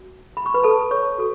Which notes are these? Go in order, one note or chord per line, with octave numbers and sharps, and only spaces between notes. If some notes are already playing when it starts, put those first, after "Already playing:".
Already playing: F#4
B5
C#6
B4 B5
A4 A5
C#5 C#6
F#4 A4